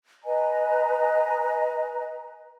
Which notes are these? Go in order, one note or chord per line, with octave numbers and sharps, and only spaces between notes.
B4 D#5 G#5 A#5